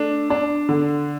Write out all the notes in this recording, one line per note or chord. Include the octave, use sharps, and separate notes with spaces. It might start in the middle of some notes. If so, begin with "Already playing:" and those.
Already playing: A3 D4
D4
D3